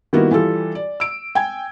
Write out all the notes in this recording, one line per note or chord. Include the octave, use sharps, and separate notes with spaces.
D#3 G3 A#3 B3 E4 F#4
E3 G3 F4 A4
D5
E6 D7
G5 G#5 G#6